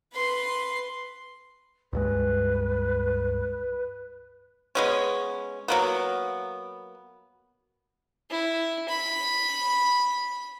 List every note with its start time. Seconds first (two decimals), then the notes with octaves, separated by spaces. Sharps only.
0.13 B4 C6
1.93 C#2 G2 G#3 B4
4.75 G#3 B3 C#4
5.68 F#3 A#3 B3
8.30 E4
8.89 B5